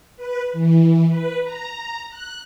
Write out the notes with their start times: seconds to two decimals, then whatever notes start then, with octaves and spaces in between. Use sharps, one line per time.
0.17 B4
0.53 E3
1.09 B4
1.44 A#5
2.09 F#6